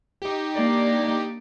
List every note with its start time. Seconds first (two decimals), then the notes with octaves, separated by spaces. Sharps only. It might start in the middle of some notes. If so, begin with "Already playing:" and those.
0.22 D#4 G4
0.55 A#3 D4 D5